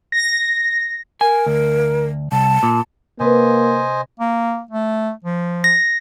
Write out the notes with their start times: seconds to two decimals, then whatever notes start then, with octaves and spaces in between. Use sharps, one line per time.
0.12 A#6
1.21 A#4 G#5
1.46 D2
2.32 C2 A5
2.63 A#2
3.20 C3 A#3 B4 C5 D#5 G#5
4.20 A#3
4.71 A3
5.25 F3
5.64 A#6